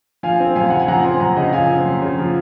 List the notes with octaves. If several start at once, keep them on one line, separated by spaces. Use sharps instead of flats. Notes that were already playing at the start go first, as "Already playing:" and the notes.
F3 F5 G#5
C4
F#2 F5 G#5
C#3 F#5
G#5
F3 F#5 A#5
C4 G#5 C6
F#2 F#5 A#5
C#3 D#5 F#5
F3 F5 G#5
C4
F#2
C#3
F3